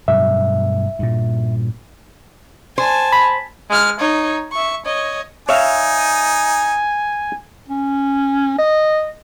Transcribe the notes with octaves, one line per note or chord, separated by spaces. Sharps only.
G2 B2 F#3 E5
G2 A#2
C5 G#5 A5
B5
G#3 F6
D#4 C#5
E5 C#6
C#5 D#5
D#4 C#5 E5 F5 G#5
C#4
D#5